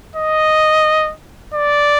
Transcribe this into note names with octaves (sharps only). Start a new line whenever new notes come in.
D#5
D5